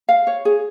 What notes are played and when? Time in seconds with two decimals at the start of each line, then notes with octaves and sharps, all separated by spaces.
0.09 F5
0.27 C#5
0.45 G#4